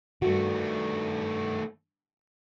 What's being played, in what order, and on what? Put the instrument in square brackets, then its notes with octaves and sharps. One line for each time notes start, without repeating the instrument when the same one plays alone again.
[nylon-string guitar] G2 F#4 [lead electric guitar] D#3 A3